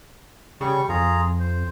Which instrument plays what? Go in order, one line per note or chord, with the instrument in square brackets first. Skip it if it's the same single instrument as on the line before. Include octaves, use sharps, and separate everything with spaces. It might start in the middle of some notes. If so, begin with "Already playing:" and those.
[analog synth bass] C#3 [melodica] G3 C#6
[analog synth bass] F2 [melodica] F4 G#4 A#5
[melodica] C5